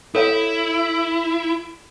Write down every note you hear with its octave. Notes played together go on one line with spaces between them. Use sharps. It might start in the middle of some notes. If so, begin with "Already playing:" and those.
E4 A4 C#5 F5